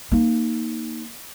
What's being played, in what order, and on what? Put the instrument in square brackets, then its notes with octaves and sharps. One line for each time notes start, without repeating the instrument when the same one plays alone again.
[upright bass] A#3 D#4